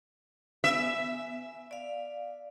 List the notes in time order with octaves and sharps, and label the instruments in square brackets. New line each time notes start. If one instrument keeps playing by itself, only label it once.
[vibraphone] B3 G#5 [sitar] E5
[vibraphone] D5 F5